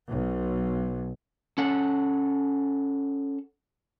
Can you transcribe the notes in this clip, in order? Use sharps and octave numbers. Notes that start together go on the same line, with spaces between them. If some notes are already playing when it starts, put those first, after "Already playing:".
B1
C#4 A4 F#5